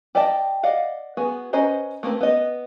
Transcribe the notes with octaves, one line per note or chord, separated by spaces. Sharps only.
G4 D5 D#5 G5 A5
D5 D#5 F5 F#5
B3 F#4 G#4
C#4 B4 C5 D#5 A#5
A3 A#3 C4 B4
B3 D#5